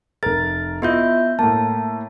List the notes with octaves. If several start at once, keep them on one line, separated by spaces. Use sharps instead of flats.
F1 A#4 A6
B3 E4 F4 D#5 E5 G6
A2 A#3 A5